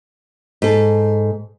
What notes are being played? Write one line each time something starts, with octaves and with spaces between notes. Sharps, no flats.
G#2 A4